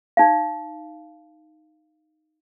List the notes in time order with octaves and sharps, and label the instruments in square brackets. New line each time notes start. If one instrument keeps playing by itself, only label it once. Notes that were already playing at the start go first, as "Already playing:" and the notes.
[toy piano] D#4 F5